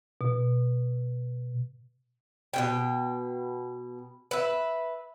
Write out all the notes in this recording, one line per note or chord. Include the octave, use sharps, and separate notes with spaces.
B2
B2 C#4 G5
B4 E5